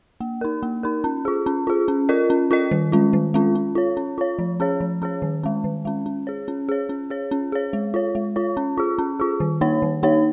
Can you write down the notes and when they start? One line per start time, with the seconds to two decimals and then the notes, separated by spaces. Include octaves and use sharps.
0.21 A#3
0.41 D#4 A#4
0.63 A#3
0.83 D#4 A#4
1.04 C#4
1.25 F4 G#4
1.46 C#4
1.67 F4 G#4
1.88 C#4
2.09 F4 A#4 D#5
2.30 C#4
2.51 F4 A#4 D#5
2.71 D#3
2.92 G#3 C#4 F4
3.13 D#3
3.34 G#3 C#4 F4
3.55 C#4
3.75 F4 C#5
3.97 C#4
4.18 F4 C#5
4.39 F3
4.60 C#4 G#4 C#5
4.81 F3
5.02 C#4 G#4 C#5
5.22 D#3
5.43 G#3 C#4
5.64 D#3
5.85 G#3 C#4
6.06 C#4
6.27 G#4 C#5
6.48 C#4
6.69 G#4 C#5
6.89 C#4
7.10 G#4 C#5
7.31 C#4
7.52 G#4 C#5
7.73 G#3
7.94 F4 C#5
8.15 G#3
8.36 F4 C#5
8.57 C#4
8.78 F4 G#4
8.98 C#4
9.20 F4 G#4
9.40 D#3
9.61 A#3 D#4 C#5
9.82 D#3
10.03 A#3 D#4 C#5